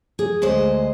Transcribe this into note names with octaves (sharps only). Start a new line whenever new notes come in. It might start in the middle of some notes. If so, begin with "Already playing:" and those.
G#4
D2 G#3 C5 D#5